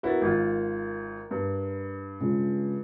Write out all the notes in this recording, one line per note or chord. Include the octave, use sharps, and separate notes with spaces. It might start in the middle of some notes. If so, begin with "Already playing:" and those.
B3 E4 F#4 A#4 A6
G#1 F4
G2
C#3 G#3 F4